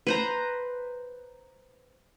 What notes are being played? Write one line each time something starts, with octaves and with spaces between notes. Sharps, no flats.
B4 C5 A#5